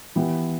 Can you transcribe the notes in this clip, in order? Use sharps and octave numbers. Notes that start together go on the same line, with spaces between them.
E3 B3 E4 G4